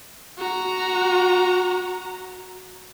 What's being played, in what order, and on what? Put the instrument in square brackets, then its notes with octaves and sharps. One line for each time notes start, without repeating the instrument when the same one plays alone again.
[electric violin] F#4 A#5